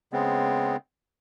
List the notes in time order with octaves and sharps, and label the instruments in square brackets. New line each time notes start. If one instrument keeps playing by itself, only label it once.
[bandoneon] C#3 G#3 B3 C4